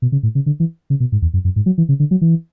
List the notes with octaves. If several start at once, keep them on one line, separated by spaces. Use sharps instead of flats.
B2
C#3
A2
C#3
D3
E3
C#3
B2
G#2
E2
F#2
F#2
G#2
F#3
E3
C#3
D3
F#3
E3